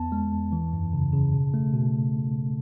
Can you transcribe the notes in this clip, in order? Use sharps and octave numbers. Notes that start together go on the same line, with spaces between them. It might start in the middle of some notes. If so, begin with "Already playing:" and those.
Already playing: E2 B3 A5
G#3
E2
E3
F#2
C#3
C#3
B2
A3
B2